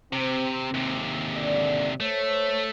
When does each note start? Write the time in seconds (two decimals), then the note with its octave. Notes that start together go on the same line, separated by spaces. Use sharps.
0.13 C3 C4
0.74 D#2 C3
1.36 D3 D5
2.00 A3 C5 C#5